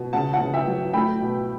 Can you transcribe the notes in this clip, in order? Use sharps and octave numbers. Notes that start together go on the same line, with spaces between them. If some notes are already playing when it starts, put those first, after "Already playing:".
Already playing: B2
C#3 F#5 A5
F#5 A5
C#3
E5 G5
F#3
A3 G5 B5
B2